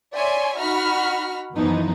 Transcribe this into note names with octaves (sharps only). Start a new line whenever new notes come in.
C#5 D5 E5 G#5 C6
D#4 F#4 B5 F6
F#2 E3 F3 B3 D#4